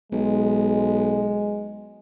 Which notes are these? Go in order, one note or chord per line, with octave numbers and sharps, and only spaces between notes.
B1 G#3